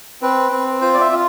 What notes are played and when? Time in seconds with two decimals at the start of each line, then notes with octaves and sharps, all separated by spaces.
0.22 C4 B4
0.52 C4
0.81 F4 C5
0.94 D5
1.01 E5
1.12 F4